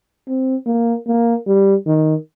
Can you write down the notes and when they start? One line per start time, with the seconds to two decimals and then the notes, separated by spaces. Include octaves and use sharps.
0.27 C4
0.66 A#3
1.07 A#3
1.47 G3
1.87 D#3